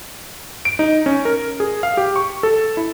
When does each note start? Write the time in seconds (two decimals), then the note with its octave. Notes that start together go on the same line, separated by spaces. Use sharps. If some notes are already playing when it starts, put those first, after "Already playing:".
0.65 D7
0.79 D#4
1.06 C#4
1.25 A#4
1.60 G#4
1.83 F5
1.97 G4
2.16 C#6
2.43 A4
2.77 E4